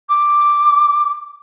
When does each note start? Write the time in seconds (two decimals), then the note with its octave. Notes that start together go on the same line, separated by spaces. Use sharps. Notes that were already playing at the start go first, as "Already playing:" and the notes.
0.09 D6